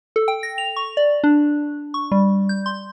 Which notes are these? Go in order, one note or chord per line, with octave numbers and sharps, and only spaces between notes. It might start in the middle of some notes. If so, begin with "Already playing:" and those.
A4
G5
A#6
F7
C#6
D5
D4
C#6
G3
G6
C6